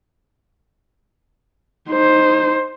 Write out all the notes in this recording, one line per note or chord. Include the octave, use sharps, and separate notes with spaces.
D#4 C5